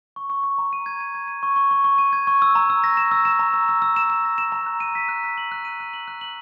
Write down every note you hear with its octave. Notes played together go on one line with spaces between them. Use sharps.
C#6
C#6
C#6
A#5
D#7
G#6
D#7
G#6
D#7
C#6
C#6
C#6
C#6
D#7
G#6
C#6
E6
A#5
E6
A#6
E7
E6
E7
A#5
E6
E6
E6
E7
E7
A#6
E7
A#5
F#6
D#7
B6
F#6
B6
F#7
F#6
D#7
F#6
F#7
F#6
F#7